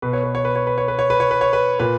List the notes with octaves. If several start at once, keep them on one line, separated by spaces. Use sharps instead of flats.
B2 B4
C#5
B4
C#5
B4
C#5
B4
C#5
B4
C#5
B4
C#5
B4
C#5
B4
A#2 B4